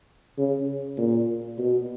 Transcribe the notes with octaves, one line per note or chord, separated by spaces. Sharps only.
C#3
A#2
B2